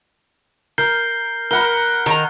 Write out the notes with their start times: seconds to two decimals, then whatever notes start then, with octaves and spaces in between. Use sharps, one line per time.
0.78 A#4 G6 C7 G7
1.51 A#4 F#5 B5 G7
2.06 D#3 A#5